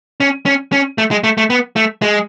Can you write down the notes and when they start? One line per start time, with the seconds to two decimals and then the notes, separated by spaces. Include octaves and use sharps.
0.20 C#4
0.46 C#4
0.72 C#4
0.98 A3
1.11 G#3
1.24 A3
1.38 A3
1.50 B3
1.76 A3
2.02 G#3